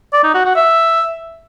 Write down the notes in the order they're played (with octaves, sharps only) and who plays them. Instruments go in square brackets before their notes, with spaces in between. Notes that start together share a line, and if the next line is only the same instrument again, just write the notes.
[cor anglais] D5
D#4
F#4
F#4
E5